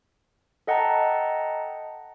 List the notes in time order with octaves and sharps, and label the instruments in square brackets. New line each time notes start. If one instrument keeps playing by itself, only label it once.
[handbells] A4 D#5 F#5 G5 A5 A#5